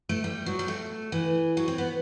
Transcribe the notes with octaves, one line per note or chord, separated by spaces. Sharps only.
A3
G3
F#3
G3
A3
E3
F#3
C4
B3